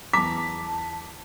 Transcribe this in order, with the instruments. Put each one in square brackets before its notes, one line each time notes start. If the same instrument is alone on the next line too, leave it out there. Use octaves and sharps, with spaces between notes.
[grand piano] E2 A#5 [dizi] A5 [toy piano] D6 [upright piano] B6